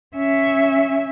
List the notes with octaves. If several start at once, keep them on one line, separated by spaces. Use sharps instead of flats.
C#4 E5